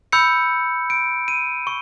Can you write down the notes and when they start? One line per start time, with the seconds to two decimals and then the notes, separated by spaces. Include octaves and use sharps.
0.12 B5 E6 G6 C#7
0.90 D7
1.28 D#7
1.67 C#6